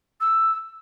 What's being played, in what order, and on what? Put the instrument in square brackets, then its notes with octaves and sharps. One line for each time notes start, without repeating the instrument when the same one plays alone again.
[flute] E6